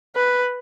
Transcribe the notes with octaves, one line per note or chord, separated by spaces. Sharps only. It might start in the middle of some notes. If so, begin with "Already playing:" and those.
B4